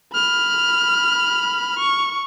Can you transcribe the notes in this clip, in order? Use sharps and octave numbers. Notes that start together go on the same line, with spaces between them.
B5 F6
C#6